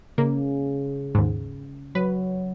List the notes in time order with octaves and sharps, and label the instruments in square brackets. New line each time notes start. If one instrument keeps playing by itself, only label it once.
[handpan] C#3 [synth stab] A#3
[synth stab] D#2 G#2
[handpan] F#3 [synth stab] B4